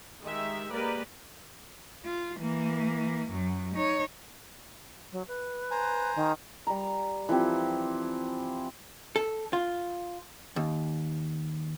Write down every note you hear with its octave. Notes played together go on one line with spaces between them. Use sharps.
D#3 G#3 G4 E5
G#3 A#3 G4 A#4 B4 D5
F4
E3 A#3
F#2 F#3
D#4 C#5
F#3
B4
C5 G#5 A#5
D#3
G3 A#5
E3 F3 C4 G4
A4
F4
D#2